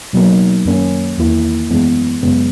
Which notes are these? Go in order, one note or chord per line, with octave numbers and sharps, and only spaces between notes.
B2 F#3 A#3 D#4
F#2 D#3 A#3 C#4
E2 D#3 A#3 E4
F#2 E3 G#3 B3
F#2 C#3 G#3 B3